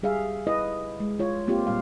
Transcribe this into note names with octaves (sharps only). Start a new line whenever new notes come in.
G3 G#4 E5 F5
E4 B4 D#5
G#3
F4 C#5
A#3 C4 F4 G4
A#2 G3 F5